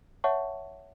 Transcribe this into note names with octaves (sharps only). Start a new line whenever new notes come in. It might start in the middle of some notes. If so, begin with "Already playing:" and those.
C#5 E5 F#5 A5 C#6